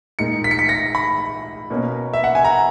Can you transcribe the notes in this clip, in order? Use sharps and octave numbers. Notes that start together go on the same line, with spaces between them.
A#2 G#3 D#4 C#7
B6
C#7
B6
A#6
B5
B2 A#3 C#4
E5
F#5
G#5
A#5